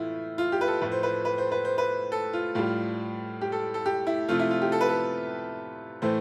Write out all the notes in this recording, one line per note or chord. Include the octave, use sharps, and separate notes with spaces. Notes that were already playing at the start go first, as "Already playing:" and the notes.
Already playing: A2 E3 A3 E4 F4
F4
G4
B4
A4
A2 F3 A3 B4
C5
B4
B4
C5
B4
C5
B4
A4
F4
A2 G3 F4
G4
A4
A4
G4
E4
C3 F3 A3 F4
E4
F4
G4
A4
B4
A4
A2 E3 A3 C5